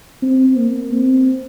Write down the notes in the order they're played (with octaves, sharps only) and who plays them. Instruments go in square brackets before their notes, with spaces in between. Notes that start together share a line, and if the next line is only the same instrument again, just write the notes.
[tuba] C4
A#3
C4